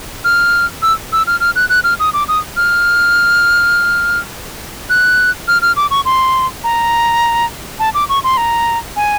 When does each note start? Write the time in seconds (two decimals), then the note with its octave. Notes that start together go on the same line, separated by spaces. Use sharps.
0.24 F6
0.82 E6
1.12 E6
1.27 F6
1.40 F6
1.56 F#6
1.69 F#6
1.84 F6
2.00 D#6
2.13 D6
2.28 D#6
2.57 F6
4.90 F#6
5.48 F6
5.62 F6
5.76 D6
5.91 C#6
6.05 C6
6.64 A#5
7.79 A5
7.94 D6
8.09 C#6
8.24 C6
8.37 A#5
8.96 G#5